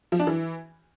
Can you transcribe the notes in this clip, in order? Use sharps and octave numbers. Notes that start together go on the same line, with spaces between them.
F3
D4
E3